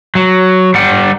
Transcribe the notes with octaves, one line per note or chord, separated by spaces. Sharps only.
F#3
G3 F#5